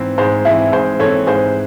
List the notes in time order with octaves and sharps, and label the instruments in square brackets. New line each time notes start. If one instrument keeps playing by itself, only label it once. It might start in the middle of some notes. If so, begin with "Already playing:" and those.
Already playing: [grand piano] G#2 E3 C4
[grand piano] G#2 [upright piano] G#4 C5
[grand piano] E3 C4 [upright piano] E4 G#4
[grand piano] G#2 [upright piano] G#4 C5
[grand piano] E3 C4 [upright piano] A4 C#5
[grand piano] G#2 [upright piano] G#4 C5